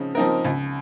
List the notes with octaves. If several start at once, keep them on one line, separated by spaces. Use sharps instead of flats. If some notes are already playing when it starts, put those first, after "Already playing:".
Already playing: C#3 F3 C4 D#4
F3 C4 D#4 A#4
C#2